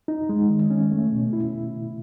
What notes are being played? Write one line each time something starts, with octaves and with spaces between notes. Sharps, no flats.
D#4
G#3
D#3
C#4
A3
B2
E4